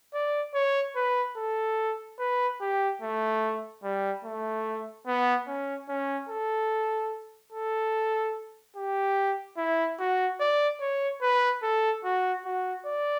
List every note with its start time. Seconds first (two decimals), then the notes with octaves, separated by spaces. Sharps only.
0.14 D5
0.54 C#5
0.96 B4
1.37 A4
2.19 B4
2.61 G4
3.01 A3
3.83 G3
4.24 A3
5.07 B3
5.47 C#4
5.89 C#4
6.29 A4
7.52 A4
8.76 G4
9.57 E4
9.99 F#4
10.40 D5
10.81 C#5
11.22 B4
11.62 A4
12.04 F#4
12.45 F#4
12.85 D5